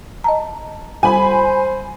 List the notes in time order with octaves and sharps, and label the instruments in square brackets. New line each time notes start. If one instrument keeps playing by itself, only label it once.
[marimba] D#5 A5 A#5
[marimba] G3 [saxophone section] C5 [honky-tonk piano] G#5 B5